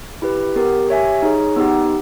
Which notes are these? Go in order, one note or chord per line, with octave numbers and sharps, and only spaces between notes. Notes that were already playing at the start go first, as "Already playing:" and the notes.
E4 G4 B4
B3 G4 A#4
G4 C#5 E5 G#5
D#4 G#4 C#5
B3 D#4 G4